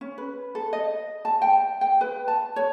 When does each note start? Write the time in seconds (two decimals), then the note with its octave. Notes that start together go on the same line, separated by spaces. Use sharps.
0.01 C#4
0.18 B4
0.55 A4
0.73 D#5
1.25 A5
1.42 G5
1.81 G5
2.01 B4
2.28 A5
2.56 C#5